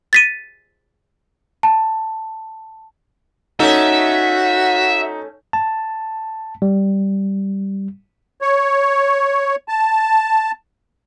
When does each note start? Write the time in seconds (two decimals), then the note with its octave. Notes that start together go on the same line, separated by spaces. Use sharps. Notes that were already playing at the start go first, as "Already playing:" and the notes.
0.13 A6 B6 D#7
1.63 A5
3.60 A3 C#4 D#4 F#4 A4 E5
5.53 A5
6.62 G3
8.42 C#5
9.68 A5